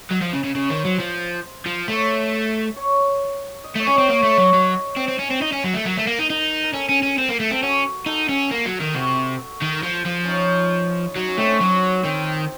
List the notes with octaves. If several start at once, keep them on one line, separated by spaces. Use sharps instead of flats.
F#3 D#5
F3
C#3
C#3
C#3 C#5
D#3 C5
F#3
F3 C5
F3
A3 C#5
C#5
D#5
A3 C#5
C#4
C4 D#5
A#3 C#5
A3 C#5
F#3 C#5
F#3 C#5
C4
C4
C#4
C4
D#4
C#4
F#3
A3
F#3 A#4
A3
A#3
D#4
D#4
A#4
C#4 A4
C#4
C#4
C4
A#3
A3
C4 A4
C#4 F#4
D#4 A4
C#4
A#3
F#3
D#3
C3 F#4
D#3
F3 F4
F3
C#4 D#4
F#3 D#4
C#4
A3 C4
C#4
F#3
D#3 C4